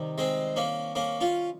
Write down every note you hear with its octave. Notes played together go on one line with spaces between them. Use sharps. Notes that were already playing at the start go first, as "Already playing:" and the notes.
Already playing: C3 D#3 G3
G#3 C4
A#3 C#4
A#3 C#4
C#4 F4